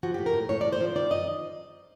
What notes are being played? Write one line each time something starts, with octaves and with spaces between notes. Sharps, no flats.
F3 F#4
A2 G4
A#4
A2
A2 C#5
A2 D5
C5
F3
D#3 D5
F#2 D#5